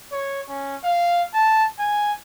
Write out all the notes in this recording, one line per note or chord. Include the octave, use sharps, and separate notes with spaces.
C#5
C#4
F5
A5
G#5